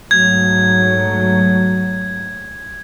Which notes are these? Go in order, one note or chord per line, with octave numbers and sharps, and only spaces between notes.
G#2 F#3 A3 G#6